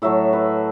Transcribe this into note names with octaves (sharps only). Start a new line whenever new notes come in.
A2 F#3 A3 E5
B4